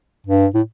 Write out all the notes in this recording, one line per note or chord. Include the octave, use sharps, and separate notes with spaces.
G2
A2